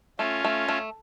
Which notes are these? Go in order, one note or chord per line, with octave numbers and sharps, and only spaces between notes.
A3 C#4 F4
A3
A3